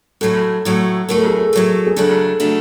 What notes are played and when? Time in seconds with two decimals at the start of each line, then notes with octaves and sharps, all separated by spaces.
0.21 A2 F#3 A3 A4
0.65 A2 F#3 A3
1.09 A2 F#3 A3 A#4
1.18 A4
1.27 G#4
1.36 A4
1.53 A2 F#3 A3
1.87 G#4
1.96 C#3 F#3 A3 D4 A4
2.40 C#3 F#3 A3 D4